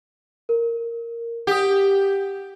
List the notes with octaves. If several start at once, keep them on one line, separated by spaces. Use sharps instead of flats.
A#4
G4 F#5 D#6